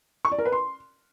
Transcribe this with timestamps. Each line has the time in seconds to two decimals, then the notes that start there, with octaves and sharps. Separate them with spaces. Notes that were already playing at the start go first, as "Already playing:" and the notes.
0.25 C#6
0.32 D5
0.38 A#4
0.45 B4
0.52 C6